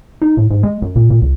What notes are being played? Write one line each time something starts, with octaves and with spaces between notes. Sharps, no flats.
D#4
A2
G#2
G#3
F#2
A#2
A#2
C#2